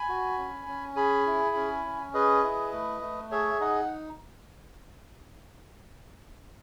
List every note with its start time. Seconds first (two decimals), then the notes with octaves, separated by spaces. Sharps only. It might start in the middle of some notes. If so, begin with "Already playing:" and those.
Already playing: G#5 B5
0.09 F#4
0.38 C#4
0.67 C#4
0.96 G#4 G#5 B5
1.26 E4
1.56 C#4
1.85 C#4
2.14 G#4 B4 D#5
2.43 E4
2.73 A3
3.02 A3
3.31 G#4 C#5 E5
3.60 D#4 D#5 F#5